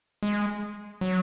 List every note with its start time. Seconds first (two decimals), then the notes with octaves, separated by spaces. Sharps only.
0.23 G#3
1.01 F#3